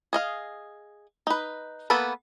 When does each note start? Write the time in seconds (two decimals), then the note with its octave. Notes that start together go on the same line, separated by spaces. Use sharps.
0.13 G#4 D#5 F5
1.27 D#4 B4
1.90 A#3 B3 A4 B4 B5